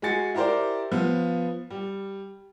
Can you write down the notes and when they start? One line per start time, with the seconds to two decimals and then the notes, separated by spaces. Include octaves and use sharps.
0.02 G#3 F#4 G#5 A6 C#7
0.35 E4 G4 A#4 C5 D5
0.92 F3 B3
1.70 G3